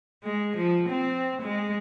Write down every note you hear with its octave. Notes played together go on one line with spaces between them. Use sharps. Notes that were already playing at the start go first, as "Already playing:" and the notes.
G#3
F3
C4
G#3